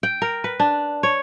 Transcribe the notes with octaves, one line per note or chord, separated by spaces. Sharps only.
G5
A#4
B4
D4
C#5